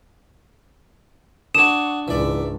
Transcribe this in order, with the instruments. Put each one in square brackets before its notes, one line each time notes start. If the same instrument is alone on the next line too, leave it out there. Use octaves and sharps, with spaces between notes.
[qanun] D4 C#5 [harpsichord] F#4 D#6 [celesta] E7
[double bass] C#2 G#2 [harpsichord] E3 D5